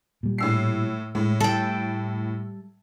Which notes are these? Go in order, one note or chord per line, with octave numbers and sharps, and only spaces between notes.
A#2 G3
A2 E6 C7
A2 G#3
G3 A4 G5